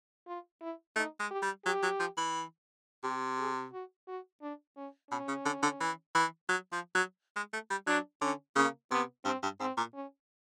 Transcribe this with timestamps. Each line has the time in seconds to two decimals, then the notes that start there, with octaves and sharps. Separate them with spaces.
0.27 F4
0.62 E4
0.96 A3 D#4
1.20 G#3
1.31 G4
1.43 G3
1.66 F#3 G4
1.83 F#3
2.00 F3
2.17 E3
3.03 C3 G4
3.39 G#4
3.72 F#4
4.08 F#4
4.42 D4
4.77 C#4
5.11 B2 C#4
5.28 C#3
5.45 D3
5.63 D3
5.80 E3
6.15 E3
6.49 F#3
6.72 F3
6.95 F#3
7.36 G#3
7.53 A3
7.70 G3
7.87 F#3 D4
8.21 D3 C#4
8.56 C#3 A#3
8.91 C3 B3
9.25 G2 C4
9.43 G2
9.60 G#2 C4
9.77 A#2
9.94 C#4